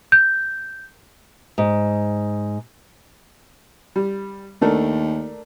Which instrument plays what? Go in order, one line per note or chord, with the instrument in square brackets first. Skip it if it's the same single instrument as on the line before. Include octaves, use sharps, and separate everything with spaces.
[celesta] G6
[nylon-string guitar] G#2
[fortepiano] G3
[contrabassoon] D#2 [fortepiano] A3 D4 A#4